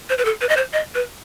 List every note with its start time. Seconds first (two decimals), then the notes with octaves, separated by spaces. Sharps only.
0.09 C5
0.18 B4
0.25 A4
0.41 B4
0.49 D#5
0.57 C5
0.73 D#5
0.95 B4